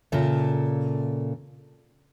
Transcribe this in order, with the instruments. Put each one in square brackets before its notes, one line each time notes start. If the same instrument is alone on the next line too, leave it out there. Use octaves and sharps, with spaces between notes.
[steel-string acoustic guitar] A#2 C#3 A4 E5